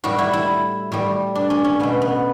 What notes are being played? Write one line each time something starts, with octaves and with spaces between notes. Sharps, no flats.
A2 G3 F#4
E4
E4
A2 G3
D4
C#4
C#4
B2 A3 B3
B3